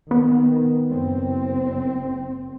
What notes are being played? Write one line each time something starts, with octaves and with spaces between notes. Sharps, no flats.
D#3 B3
F#1 C4